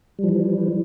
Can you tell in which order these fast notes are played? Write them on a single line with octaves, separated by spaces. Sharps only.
G3 F3 E3